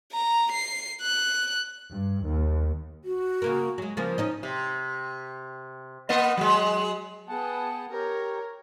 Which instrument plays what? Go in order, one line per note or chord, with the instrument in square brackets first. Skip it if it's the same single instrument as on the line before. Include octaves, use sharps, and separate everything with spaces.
[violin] A#5
C7
F#6
[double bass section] G2
D#2
[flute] F#4
[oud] C#3 A#3 A#4
F#3 G#3
[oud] C#3 F3 A#3 [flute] C5
[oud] C#4 D#4 D#5
[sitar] C3
A#3 B3 D#5
F#3 G#3
[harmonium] B3 F#5 A5 [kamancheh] G#4 G5
[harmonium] G4 A#5 [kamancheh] A#4 C#5